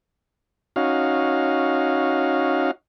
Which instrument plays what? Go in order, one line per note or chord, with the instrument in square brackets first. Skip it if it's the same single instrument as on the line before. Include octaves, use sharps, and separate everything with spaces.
[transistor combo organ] C#4 D#4 F#4 F5